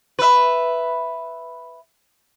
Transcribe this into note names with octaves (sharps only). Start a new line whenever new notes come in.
B4 E5